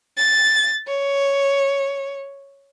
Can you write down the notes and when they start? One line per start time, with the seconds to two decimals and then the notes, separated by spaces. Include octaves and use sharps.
0.17 A6
0.87 C#5